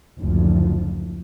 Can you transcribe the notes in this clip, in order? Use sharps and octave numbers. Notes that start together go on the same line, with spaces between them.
F#1 D2 F3